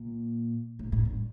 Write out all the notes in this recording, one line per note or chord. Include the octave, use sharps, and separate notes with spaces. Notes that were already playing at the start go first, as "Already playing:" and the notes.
Already playing: A#2
A2
A2
G2